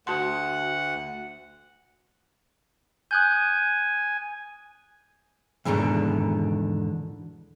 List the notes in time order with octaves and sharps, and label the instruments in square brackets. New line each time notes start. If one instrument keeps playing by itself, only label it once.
[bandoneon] D2 F#5 [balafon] F#4 A5 C6
[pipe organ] G#5 [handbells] D#6 F#6 G6
[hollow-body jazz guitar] E2 G#2 B2 D3 D#3